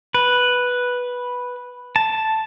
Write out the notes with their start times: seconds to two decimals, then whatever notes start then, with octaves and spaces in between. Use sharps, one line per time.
0.14 B4
1.96 A5